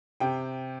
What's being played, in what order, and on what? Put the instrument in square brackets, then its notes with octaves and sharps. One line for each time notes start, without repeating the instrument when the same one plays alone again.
[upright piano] C3 G5